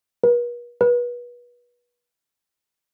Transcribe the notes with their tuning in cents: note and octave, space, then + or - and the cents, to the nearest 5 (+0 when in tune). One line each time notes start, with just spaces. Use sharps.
B4 -45
B4 -30